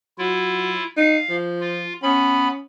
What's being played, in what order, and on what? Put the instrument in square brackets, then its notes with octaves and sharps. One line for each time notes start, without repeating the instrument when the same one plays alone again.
[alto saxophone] F#3 [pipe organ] E4 F4
[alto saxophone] D#4 [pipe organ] F5
[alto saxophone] F3
[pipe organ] F4
[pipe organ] B3 B5 [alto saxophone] C#4